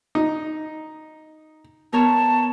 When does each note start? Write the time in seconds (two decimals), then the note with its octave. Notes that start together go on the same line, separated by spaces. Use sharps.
0.15 D#4
1.93 B3 A#4 C#5 A5